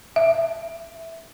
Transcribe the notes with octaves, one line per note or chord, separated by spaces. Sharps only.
E5